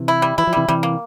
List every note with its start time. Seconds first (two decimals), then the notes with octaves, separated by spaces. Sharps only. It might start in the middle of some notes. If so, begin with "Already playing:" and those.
Already playing: C3 E3
0.08 E4
0.22 G3
0.38 E3 E4
0.47 F3
0.53 C3 E3 G3
0.68 C3 E3 G3
0.83 A#3